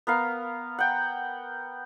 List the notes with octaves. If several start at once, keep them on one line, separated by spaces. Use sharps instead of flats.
B3 A#4 F5
F#5 G5